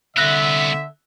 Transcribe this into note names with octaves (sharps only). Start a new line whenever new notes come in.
C2 D3 B3 E5 E6 F#6 A#6